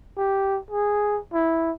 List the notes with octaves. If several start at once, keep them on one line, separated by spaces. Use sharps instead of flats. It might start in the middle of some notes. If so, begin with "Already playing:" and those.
G4
G#4
E4